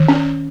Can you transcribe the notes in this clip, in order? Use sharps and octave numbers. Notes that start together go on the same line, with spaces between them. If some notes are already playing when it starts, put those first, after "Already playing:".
Already playing: D#3
C#4